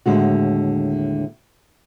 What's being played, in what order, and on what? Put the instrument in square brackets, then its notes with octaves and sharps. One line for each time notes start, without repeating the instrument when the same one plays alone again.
[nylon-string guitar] D#2 A2 D3 G#3 F#4